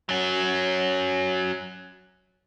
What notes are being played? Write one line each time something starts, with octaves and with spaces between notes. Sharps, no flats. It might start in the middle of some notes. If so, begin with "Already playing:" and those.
F#3 C#4